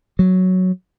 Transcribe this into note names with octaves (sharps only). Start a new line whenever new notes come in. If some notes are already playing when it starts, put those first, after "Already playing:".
F#3